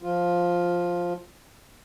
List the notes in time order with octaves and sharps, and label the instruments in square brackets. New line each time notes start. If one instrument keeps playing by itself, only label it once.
[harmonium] F3 F4